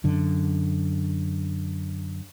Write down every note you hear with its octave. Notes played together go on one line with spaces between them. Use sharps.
F#2 D3